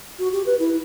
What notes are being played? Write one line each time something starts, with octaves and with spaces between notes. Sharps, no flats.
F#4
G4
B4
E4